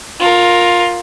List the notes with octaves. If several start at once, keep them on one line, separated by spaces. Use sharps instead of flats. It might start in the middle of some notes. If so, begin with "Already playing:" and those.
F4 A#4